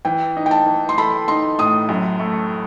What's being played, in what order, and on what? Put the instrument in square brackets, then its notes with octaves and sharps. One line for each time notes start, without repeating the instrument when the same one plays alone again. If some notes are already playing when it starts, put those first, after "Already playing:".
[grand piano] E3 [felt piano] G5
[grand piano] D#4
[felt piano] G5
A5
[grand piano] E3
[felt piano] C6
[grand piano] A4 [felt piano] B5
[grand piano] D#4 [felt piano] C6
[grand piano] A2 [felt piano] D#6
[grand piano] F#2
A3